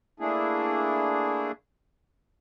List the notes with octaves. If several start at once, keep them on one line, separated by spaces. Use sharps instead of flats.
A3 A#3 D4 E4 G#4